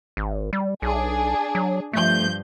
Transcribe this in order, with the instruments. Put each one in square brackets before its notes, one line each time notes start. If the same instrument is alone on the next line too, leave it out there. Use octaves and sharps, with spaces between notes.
[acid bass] G#1
G3
[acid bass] B1 [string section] D4 G#4
[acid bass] F#3
[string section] G2 F3 G6 [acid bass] A3